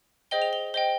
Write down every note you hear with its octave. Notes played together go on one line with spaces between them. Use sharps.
G#4 C5 D#5 G5 G7
F7
G7
C5 D#5 G5 G7